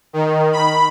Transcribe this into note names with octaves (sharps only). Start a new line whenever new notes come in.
D#3
B5